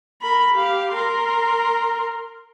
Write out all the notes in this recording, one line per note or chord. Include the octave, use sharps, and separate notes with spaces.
A#4 B5
G4 F5
A#4 C6